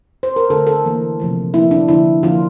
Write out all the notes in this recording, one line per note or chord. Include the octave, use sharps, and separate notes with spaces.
C5
A#4
D3 A3 A4
A4
E3 A#3
C3 F3 A3
D3 F3 A#3 E4
D4
D3 F3 A#3 E4
D3 F3 A#3 F4